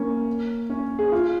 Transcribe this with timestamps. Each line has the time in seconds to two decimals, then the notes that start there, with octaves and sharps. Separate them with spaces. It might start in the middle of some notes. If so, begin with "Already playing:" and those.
Already playing: A#3 C#4
0.70 C#4
0.99 G#4
1.12 F4